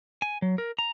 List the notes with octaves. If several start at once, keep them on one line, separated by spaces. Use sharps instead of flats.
G#5
F#3
A#4
A#5